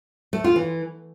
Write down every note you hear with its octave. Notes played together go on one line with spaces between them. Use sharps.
A3
F4
E3